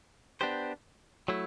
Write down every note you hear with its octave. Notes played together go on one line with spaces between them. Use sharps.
B3 D4 G4 C5
F#3 A3 E4